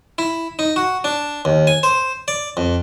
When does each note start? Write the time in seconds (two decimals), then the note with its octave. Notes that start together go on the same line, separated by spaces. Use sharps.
0.18 E4
0.59 D#4
0.76 F#4
1.04 D4
1.45 D#2
1.67 G#5
1.83 C5
2.28 D5
2.57 F2